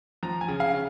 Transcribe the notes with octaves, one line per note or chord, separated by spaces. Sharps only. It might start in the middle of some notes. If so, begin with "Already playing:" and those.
F3 A#5
G#5
C#3
F5
C#3